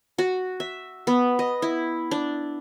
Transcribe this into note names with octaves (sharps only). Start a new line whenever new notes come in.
F#4
E5
B3
D#5
E4
D4